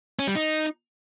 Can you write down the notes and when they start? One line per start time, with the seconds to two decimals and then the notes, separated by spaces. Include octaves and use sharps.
0.19 C#4
0.27 G3
0.35 D#4